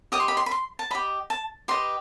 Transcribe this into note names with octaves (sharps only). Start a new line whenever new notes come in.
G4 D#5 D#6
C6
B5
C6
B5
C6
A5
G4 D#5 B5
A5
G4 B4 D#5 C6